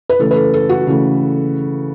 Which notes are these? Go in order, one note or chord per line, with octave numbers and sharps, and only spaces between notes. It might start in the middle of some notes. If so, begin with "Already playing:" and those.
B4
C#3 E3 A3 A4
B4
A4
A4
F#4
C#3 E3 A3